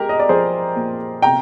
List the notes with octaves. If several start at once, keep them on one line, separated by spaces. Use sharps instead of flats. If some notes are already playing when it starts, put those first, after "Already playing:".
Already playing: G#3 G4 A#4
D#5
D5
F3 G#4 C5
A#2
C3 G5 A#5